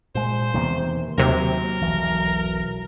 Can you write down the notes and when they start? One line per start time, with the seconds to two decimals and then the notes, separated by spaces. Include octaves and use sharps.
0.15 A#2 G#3 C5
0.54 E2 C3 D#3 A#3
1.18 D#2 C3 F#3 A#4
1.82 E1 B1 E3